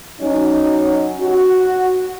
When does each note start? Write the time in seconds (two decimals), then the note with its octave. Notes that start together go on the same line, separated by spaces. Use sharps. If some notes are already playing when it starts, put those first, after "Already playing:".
0.21 F#3 C#4 D#4
1.21 F#4